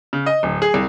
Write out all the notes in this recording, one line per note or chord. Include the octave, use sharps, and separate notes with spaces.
C#3
D#5
D1
G#4
C2